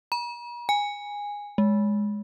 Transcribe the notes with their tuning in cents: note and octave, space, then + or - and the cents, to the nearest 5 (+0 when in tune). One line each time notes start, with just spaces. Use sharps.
A#5 +45
G#5 -15
G#3 +0